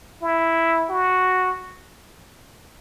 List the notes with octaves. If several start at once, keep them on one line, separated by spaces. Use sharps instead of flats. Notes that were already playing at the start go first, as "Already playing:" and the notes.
E4
F#4